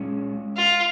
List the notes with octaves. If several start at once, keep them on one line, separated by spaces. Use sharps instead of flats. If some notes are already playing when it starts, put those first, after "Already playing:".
Already playing: A#2 G#3 C#4
F4